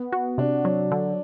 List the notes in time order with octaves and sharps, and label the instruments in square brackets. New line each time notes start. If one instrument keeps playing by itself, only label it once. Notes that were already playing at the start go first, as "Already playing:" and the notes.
Already playing: [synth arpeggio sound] B3
F#4
[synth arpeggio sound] C3 [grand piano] D4
[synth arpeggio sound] F#3
D3